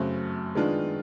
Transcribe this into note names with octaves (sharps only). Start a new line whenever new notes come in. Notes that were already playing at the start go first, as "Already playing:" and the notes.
Already playing: F#2 C#3 F#3 A3 C4
D#3 G#3 B3 D4 F4